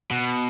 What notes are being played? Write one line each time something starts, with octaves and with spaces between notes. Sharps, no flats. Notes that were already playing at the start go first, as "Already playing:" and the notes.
B2